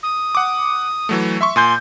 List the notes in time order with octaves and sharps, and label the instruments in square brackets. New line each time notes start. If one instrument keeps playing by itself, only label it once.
[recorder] D#6
[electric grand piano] F#5 D6
E3 F#3 A3
E5 C6 C#6
[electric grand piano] A#2 G#5 G6 [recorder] C6